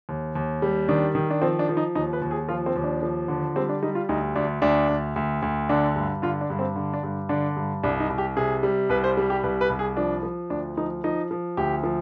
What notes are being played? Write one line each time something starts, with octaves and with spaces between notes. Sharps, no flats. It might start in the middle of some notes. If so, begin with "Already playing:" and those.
D#2
D#2
G3
D#3 D4
D#3
D4
F3 C4
D4
F3
D#4
D#2 D#4
B4
D#2
G#4
F3 F4
C4
D#2
D4
F3
D3
G3 C4
D4
G3 D#4
F4
D2 D#4
D2 D4
D2 D4
D2
D2
D2
D3 D4
G2
D3 F4
D4
G2
C4
D3
D4
G2
D3 D4
G2
C2 D4
D#4
C2
G4
C3 G#4
G3
C2 B4
C5
G3
G4
C2 B4
B4
C2
G#4
F3 D4
F3
D2 D4
F3 D#4
F3 D#4
F3
D2 G4
F3